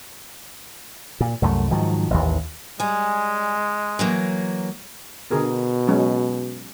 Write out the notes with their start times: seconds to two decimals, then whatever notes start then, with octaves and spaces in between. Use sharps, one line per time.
1.20 A#2
1.42 C2 F#2 F3 A3
1.71 G#2 D#3 F3 F#3
2.11 A1 D#2
2.80 G3 G#3 G#5
3.99 E3 F#3 A#3
5.31 B2 D3 G#4 A#4
5.88 F#3 G#3 C#4